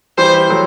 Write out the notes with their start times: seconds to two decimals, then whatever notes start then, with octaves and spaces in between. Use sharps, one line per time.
0.18 E3 G3 C5
0.49 F#3 A3